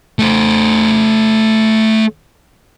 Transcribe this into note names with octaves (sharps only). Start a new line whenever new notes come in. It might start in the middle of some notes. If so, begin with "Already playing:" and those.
A3 C5